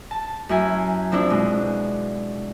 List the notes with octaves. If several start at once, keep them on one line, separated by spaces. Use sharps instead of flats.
A5
F#2 E4 G#5
F3 C4 D4 E4
B2 G#3